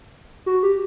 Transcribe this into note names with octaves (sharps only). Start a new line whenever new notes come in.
F#4
G4